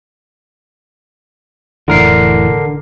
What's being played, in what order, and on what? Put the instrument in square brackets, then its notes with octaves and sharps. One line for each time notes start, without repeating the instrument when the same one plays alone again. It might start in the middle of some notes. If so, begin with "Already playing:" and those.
[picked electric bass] F1 A2 E3 [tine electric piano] D3 A#4 C7